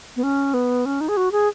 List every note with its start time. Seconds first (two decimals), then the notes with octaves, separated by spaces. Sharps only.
0.16 B3
0.23 C#4
0.54 B3
0.86 C#4
1.01 D#4
1.09 G#4
1.17 F#4
1.32 G#4